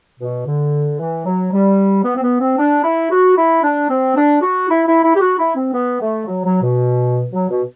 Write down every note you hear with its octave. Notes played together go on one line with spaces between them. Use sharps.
B2
D3
E3
F#3
G3
B3
C4
B3
C4
D4
E4
F#4
E4
D4
C4
D4
F#4
E4
E4
E4
G4
F#4
E4
C4
B3
A3
F#3
F#3
B2
F#3
B2